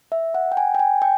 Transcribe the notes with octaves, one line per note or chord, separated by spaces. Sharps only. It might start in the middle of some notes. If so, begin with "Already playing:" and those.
E5
F#5
G5
G#5
G5
G#5
G5